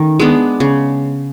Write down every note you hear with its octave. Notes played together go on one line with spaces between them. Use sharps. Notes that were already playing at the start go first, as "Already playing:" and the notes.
Already playing: D#3 A3 C#4
G#3 B3 D4
C#3